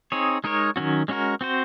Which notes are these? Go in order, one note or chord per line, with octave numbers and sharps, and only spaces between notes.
C4 D#4 G#4 C#5
G#3 D#4 A#4 C#5
D#3 F#3 C#4 F#4
G#3 C#4 F#4 A#4
C4 F#4 C5